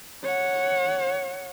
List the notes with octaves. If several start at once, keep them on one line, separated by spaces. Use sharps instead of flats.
C#5 F#5